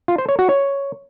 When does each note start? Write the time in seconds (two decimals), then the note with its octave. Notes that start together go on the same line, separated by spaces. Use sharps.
0.08 F4
0.18 C5
0.29 C#5
0.39 F#4
0.49 C#5